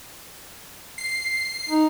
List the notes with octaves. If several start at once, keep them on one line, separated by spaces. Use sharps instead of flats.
C7
D#4